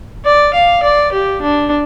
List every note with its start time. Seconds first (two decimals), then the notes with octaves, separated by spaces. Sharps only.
0.25 D5
0.53 F5
0.83 D5
1.12 G4
1.41 D4